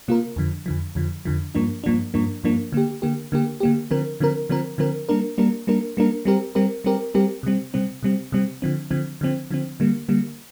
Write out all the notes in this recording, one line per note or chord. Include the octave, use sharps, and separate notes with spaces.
C3 A#3 F4 A#4
F2 D3 F3
F2 D3 F3
F2 D3 F3
F2 D3 F3
G2 F3 A#3 D4
G2 F3 A#3 D4
G2 F3 A#3 D4
G2 F3 A#3 D4
D3 A#3 G4
D3 A#3 G4
D3 A#3 G4
D3 A#3 G4
D3 F3 C4 A#4
D3 F3 C4 A#4
D3 F3 C4 A#4
D3 F3 C4 A#4
G3 A#3 D4 A#4
G3 A#3 D4 A#4
G3 A#3 D4 A#4
G3 A#3 D4 A#4
G3 C4 G4 A#4
G3 C4 G4 A#4
G3 C4 G4 A#4
G3 C4 G4 A#4
C3 G3 C4
C3 G3 C4
C3 G3 C4
C3 G3 C4
D3 F3 C4
D3 F3 C4
D3 F3 C4
D3 F3 C4
D3 G3 A#3
D3 G3 A#3